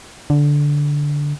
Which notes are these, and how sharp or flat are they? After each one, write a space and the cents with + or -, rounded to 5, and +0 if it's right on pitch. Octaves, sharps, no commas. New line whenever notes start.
D3 -10